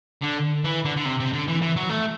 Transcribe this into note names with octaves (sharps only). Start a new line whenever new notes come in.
D3
E3
D3
D3
C3
C3
D3
E3
E3
F#3
A3